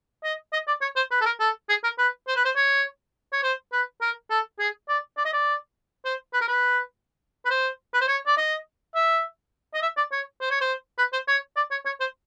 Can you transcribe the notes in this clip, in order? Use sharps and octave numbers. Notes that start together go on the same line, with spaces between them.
D#5
D#5
D5
C#5
C5
B4
A4
A#4
A4
G#4
A#4
B4
C5
B4
C5
C#5
C#5
C5
B4
A#4
A4
G#4
D5
D5
D#5
D5
C5
B4
A#4
B4
B4
C5
B4
C5
C#5
D5
D#5
E5
D#5
E5
D5
C#5
C5
C#5
C5
B4
C5
C#5
D5
C#5
C#5
C5